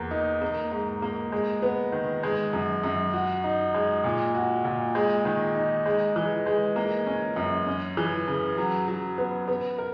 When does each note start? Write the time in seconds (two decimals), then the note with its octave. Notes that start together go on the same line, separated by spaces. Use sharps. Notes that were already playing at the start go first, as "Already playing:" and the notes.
Already playing: E2 A#3
0.11 D#4
0.42 A#3
0.71 G#2
1.02 A#3
1.32 G#3
1.62 B3
1.92 D#3
2.23 G#3
2.53 F#2
2.84 F#2
3.13 F#4
3.44 D#4
3.74 G#3
4.04 A#2
4.35 F#4
4.65 A#2
4.95 G#3
5.25 D#3
5.56 D#4
5.86 G#3
6.16 E3
6.46 G#3
6.76 A#3
7.07 C#4
7.36 F#2
7.67 C#4
7.97 E3
8.27 C#3
8.58 F#3
8.88 F#3
9.18 B3
9.48 B3
9.78 A#4